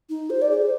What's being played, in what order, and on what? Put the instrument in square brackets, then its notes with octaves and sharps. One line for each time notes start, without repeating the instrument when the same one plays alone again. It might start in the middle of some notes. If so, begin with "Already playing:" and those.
[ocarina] D#4
C5
D5
G#4
C5